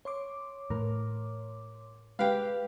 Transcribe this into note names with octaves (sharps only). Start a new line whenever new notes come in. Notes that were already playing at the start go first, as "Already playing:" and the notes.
C#5 C6 D6
A2 E3 A#4
G#3 G4 B4 F5 G5 F#6